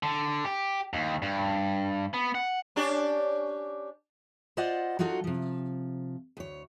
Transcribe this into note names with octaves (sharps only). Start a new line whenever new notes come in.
D3
G4
D#2
G2
B3
F#5
C#4 D4 G4
F4 C5 D5 D#5 F#5
F#3 D#4 F4 F#4 A4
C3 F3
D2 C#5